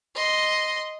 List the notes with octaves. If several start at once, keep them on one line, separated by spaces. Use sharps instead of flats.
D#5 C6